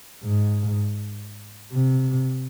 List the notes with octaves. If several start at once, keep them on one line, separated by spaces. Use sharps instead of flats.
G#2
C3